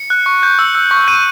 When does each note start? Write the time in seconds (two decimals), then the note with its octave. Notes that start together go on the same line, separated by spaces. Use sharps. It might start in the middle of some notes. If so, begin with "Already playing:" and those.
Already playing: C#7
0.10 F#6
0.26 C#6
0.43 G6
0.59 E6
0.75 E6
0.91 C#6
1.08 G6 D#7